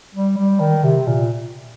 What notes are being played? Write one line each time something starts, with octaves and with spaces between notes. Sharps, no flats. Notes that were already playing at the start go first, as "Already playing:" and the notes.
G3
G3
D#3
C3
A#2